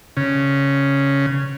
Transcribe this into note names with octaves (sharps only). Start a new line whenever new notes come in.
C#3